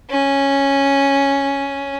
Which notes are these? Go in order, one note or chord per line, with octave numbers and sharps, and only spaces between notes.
C#4